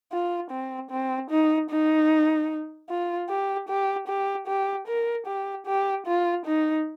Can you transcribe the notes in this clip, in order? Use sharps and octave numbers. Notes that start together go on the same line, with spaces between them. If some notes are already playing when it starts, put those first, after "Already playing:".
F4
C4
C4
D#4
D#4
F4
G4
G4
G4
G4
A#4
G4
G4
F4
D#4